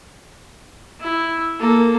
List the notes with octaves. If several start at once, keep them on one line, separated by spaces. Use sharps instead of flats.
E4
A#3 A4